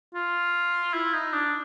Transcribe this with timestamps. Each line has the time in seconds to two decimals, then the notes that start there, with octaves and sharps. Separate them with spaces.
0.15 F4
0.94 E4
1.14 D#4
1.33 D4